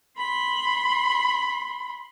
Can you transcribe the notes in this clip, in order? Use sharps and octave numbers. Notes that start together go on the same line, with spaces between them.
B5 C6